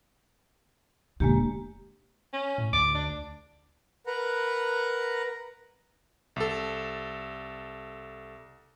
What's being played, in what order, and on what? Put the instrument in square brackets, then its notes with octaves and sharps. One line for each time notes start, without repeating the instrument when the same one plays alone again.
[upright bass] E1 D3 [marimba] G#3 A#3 G4
[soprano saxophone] C#4
[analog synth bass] A2
[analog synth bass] D2 [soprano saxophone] D6
[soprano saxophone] D4
[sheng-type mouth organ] A#4 B4 F#5 A#5
[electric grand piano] C2 A4